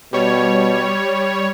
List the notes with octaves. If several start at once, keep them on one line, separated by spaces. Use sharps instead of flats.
B2 G3 C#5